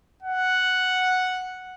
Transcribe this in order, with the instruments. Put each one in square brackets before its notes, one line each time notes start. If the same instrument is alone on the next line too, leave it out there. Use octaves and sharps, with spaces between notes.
[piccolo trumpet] F#5